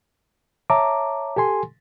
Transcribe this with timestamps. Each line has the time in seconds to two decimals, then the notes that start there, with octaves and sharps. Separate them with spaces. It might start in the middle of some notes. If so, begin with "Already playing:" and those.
0.70 C#5 E5 A5 A#5 D6
1.36 G4 A4 G#5 C6